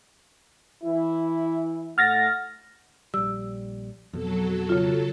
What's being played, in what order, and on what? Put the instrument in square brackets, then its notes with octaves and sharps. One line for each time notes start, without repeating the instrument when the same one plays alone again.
[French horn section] E3 E4
[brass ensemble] A2 A3 F#5 [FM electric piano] F6 A6 A#6
[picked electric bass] A#1 G3 [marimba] E6
[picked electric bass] F2 B2 [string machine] F#3 A4
[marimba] C#3 F4